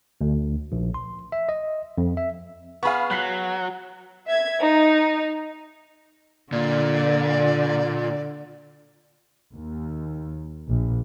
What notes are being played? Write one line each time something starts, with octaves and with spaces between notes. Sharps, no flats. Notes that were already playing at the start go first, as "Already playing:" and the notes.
D2
A#1
C6
E5
D#5
F2
E5
B3 G#4 F5 B5 C#6
F#3 F#6 B6 C7
E5 G#6
D#4
A#2 D3 D5
D#2
A#1